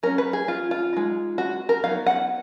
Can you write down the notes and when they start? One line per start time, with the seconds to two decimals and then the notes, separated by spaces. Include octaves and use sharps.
0.03 F#3 C#4 A#4
0.18 B4
0.33 G#4
0.48 F4
0.71 F4
0.93 G#3 D#4
1.38 F#4
1.69 A#4
1.84 F#3 B3 D#4 F5
2.06 F#5